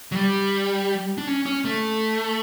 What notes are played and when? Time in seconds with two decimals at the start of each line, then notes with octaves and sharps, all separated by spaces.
0.12 F#3
0.15 G3
1.18 D4
1.27 C#4
1.46 C#4
1.65 A3